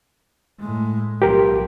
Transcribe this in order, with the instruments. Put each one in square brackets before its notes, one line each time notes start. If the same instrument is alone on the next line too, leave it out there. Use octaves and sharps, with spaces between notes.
[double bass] A2 G#3
[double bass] B1 F3 [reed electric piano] G4 A#4